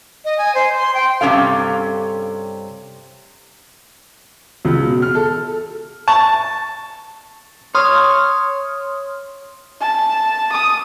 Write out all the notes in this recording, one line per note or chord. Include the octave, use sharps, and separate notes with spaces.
D#5
G#5
C5
C6
G5
G2 C3 G3 C#4 A4 F5
C#2
B2
F6
A4
A5 C#6
C#5 C6 D#6 F6
A5
D#6